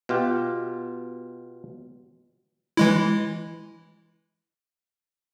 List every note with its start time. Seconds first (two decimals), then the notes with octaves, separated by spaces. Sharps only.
0.09 B2 F4 G4
2.77 E3 G#3 E4